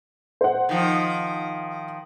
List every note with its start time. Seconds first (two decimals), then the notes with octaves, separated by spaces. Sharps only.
0.41 C5 F#5
0.69 D#3 F3